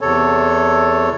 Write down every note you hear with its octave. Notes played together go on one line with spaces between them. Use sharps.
E2 C3 A4 C#5